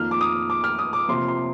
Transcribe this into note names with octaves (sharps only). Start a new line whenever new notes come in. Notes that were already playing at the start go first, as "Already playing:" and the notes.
Already playing: F2 D#3 A#3 F6
D6
D#6
D6
F6
D#6
D6
C3 F3 A#3 C6
C6